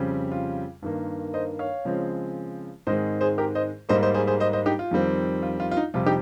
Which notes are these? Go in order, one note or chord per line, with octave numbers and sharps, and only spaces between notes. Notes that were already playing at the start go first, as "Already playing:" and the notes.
Already playing: F2 C#3 G3 C4
F4
G2 D#3 A#3
C5 D#5
C#5 F5
C#3 F3 G#3 C4
G#2 D#3 G#3 C4 C5 D#5
G#4 C5
G4 A#4
C5 D#5
G#2 G3 A#3 C5 D#5
C5 D#5
G#4 C5
G#4 C5
C5 D#5
C5 D#5
D#4 G4
F4
F2 D#3 G3 C4
F4
F4
F4
D#4
F2 C3 G3 F4
D#4 G4